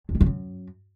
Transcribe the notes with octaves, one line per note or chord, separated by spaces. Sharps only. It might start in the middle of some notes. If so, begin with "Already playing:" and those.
F2
D#3
F2
F#2